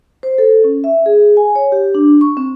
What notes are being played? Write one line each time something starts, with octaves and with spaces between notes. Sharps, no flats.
C5
A4
C#4
E5
G#4
G#5
C#5
G4
D4
C#6
C4